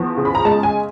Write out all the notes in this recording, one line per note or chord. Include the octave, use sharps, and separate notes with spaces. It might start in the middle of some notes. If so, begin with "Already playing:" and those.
Already playing: E2 F3
C#3
B5
A#5
G#3 A5
G#5